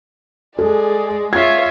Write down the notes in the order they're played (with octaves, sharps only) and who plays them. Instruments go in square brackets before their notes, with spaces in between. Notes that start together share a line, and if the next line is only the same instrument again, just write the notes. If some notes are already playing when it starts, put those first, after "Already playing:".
[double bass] G#3 [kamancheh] G#4 D5 [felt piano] A4
[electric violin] F4 E5 [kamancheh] C#5 F5 [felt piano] G#6